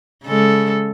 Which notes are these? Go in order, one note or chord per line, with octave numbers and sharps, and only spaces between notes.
C#3 G#3 A4